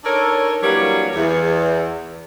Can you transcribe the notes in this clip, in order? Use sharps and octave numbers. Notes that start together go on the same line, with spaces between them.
D4 D#4 A4 A#4 C#5
E3 F#3 G3 A#3 D4 C#5
E2